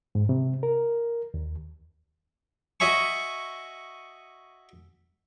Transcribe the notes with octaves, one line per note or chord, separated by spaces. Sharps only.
G#2
C3
A#4
D#2
F#4 D#5 E5 G#5 C#6